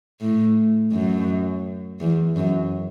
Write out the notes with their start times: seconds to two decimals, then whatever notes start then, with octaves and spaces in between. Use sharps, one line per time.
0.21 A2
0.93 F#2
2.00 E2
2.36 F#2